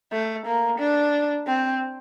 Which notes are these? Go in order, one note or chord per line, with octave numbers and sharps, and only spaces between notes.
A3
A#3
D4
C4